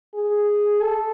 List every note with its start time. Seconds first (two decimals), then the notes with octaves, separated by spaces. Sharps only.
0.15 G#4
0.81 A4